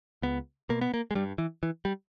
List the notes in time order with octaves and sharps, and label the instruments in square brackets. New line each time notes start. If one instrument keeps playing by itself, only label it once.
[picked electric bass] C#2 B3
B2 A#3
B3
A#3
G#3
G2 G3
E3
E3
G3